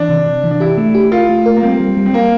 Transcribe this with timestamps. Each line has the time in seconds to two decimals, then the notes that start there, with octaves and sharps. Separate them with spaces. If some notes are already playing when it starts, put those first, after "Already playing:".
Already playing: E3 D4
0.10 C3
0.27 C3
0.44 E3
0.51 D4
0.60 E4 G4
0.78 A3
0.95 G4
1.11 F4 A#4
1.29 A3
1.46 A#4
1.57 A#3
1.63 G3 C4
1.80 G3
1.97 G3
2.06 C4
2.13 G3 A#3